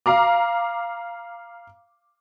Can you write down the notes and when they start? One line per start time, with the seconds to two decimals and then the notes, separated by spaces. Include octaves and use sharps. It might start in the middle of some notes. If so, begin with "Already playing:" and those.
0.06 F5 A#5 D6